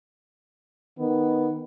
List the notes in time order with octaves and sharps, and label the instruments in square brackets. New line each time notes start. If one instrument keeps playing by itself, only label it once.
[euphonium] D#3 [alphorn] B3